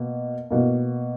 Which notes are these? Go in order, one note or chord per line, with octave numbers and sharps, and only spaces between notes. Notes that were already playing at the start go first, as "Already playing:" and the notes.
Already playing: B2 A#3
B2 A#3